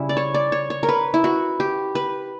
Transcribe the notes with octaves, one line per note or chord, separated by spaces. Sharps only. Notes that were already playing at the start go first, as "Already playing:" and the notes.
Already playing: C#3 G3 C#4 E4
D5
C#5
D5
C#5
C#5
A#4
B4
E4
F#4
G4
B4